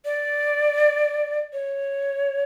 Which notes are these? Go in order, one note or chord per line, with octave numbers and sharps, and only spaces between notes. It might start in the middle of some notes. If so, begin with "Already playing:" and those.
D5
C#5